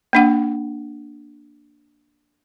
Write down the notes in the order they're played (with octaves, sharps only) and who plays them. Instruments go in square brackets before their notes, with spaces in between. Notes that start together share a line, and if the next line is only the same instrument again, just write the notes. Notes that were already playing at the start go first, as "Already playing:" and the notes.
[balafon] A#3 D4 F#5